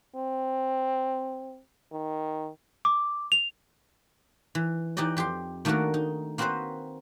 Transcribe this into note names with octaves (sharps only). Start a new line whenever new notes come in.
C4
D#3
D6
F7
E3
E3 D#4 G4 D5 D#5
F2 G4 G5 C6
D#3 A3 A#3 D4 F#4 A#4
D#4
A#3 C4 F#4 B4 C5 D#5